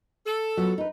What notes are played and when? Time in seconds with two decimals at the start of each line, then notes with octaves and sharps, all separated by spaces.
0.26 A4
0.57 F#3 B3 F4
0.78 D#4 B4